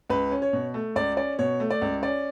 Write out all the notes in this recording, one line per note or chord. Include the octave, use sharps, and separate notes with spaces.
C#2 B4
C#4
C#5
B2
A3
C#2 D5
C#4 D5
B2 C#5
A3
D5
C#2
C#4 D5